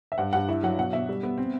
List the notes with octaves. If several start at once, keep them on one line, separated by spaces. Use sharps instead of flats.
E5
G2 F#5
G2 F#5
E4 E5
F#3 F#5
B2 F#5
B2 E5
G3
B3
C4